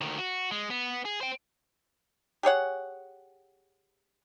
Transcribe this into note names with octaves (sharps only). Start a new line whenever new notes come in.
D2 D#3
F#4
G#3
B3
G#4
C5 G5
G4 G#4 C#5 F#5